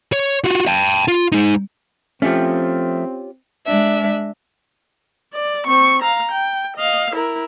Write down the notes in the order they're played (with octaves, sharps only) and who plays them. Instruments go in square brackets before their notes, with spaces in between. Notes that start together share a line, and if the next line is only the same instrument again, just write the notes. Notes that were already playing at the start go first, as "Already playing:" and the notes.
[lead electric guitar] C#5
F4 F#4
G5 A5
F4
G#3 D#4
[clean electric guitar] F3 A3 [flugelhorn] C4 [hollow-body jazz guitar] C#4 F4 G4
[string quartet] G#3 D4 E5
[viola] D5
C4 C#6
F5 A#5
G5
D#5 F5
E4 A#4